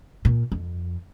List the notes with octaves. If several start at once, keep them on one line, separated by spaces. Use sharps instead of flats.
A#2
F2